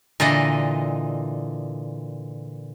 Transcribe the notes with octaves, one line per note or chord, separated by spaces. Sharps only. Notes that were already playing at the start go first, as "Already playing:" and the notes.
A#2 D3 E3 D#5